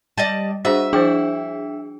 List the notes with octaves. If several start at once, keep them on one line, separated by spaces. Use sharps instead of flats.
G3 D5 D#5 A5
D4 F#4 G#4 C5 D#5 E5
F3 D4 E4 G#4 C5 G5